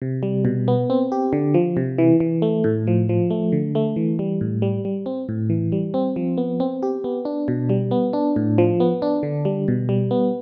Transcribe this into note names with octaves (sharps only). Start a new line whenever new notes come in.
C3
G3
B2
B3
C4
G4
D3
F3
C3
E3
E3
A3
A2
F3
F3
A3
D3
A3
E3
G3
A2
G3
G3
C4
A2
E3
G3
C4
F3
B3
C4
G4
B3
D4
B2
G3
B3
D4
A2
F3
B3
D4
D3
G3
B2
G3
B3